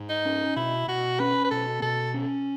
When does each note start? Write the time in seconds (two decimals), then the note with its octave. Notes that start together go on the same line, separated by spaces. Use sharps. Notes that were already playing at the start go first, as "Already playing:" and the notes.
Already playing: G#2
0.09 D#4
0.25 C#4
0.56 B2 E4
0.87 B2 F#4
1.19 C#4 B4
1.44 B4
1.51 B2 A4
1.82 B2 A4
2.14 C#4